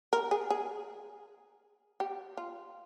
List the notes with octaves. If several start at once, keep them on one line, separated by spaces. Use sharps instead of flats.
A#4
G#4
G#4
G4
F4